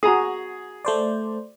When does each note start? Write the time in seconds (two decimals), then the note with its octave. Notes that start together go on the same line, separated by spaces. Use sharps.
0.03 F#4 G#4 A#5 D#6
0.85 A3 C5 D5